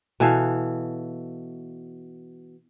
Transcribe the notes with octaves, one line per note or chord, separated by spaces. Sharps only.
B2 E3 A4 F5